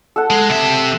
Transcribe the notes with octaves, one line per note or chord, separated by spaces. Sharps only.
A4 F#5
G#3
C3 E5